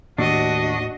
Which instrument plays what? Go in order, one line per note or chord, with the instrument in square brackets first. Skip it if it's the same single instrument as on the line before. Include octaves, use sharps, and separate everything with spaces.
[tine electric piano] D#2 [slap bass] A2 [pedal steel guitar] D4 [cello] F#4 D#5